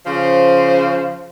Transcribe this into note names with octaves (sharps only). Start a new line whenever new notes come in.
C#3 F3 C5